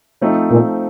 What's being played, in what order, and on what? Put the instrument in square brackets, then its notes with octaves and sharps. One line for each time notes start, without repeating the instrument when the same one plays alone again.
[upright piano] F3 A3 C4 D#4
[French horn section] A#2